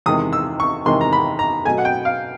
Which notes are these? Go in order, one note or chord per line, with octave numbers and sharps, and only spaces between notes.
E2 C3 D#3 G#3 D#6
E6
C#6
E2 C3 D#3 G#3 C6
A#5
B5
A#5
B2 F#3 A3 G#5
F#5
G5
F5